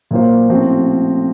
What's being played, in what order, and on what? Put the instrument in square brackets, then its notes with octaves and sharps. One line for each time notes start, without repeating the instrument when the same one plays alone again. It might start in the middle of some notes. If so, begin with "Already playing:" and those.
[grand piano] A#2 F#3 A#3 F4 C5
A1 A2 F3 C4 F#4